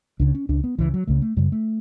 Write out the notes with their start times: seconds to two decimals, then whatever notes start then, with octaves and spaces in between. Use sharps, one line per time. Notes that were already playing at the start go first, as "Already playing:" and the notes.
0.20 C#2 C#3 D4
0.35 C#4
0.49 C#2 C#3 D4
0.64 B3
0.79 C#2 C#3 E3
0.94 F#3
1.07 C#2 C#3 A3
1.22 A3
1.37 F#2 C#3 G3
1.52 A3